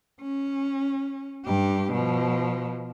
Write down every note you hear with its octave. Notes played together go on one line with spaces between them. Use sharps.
C#4
G2 G4
B2 F3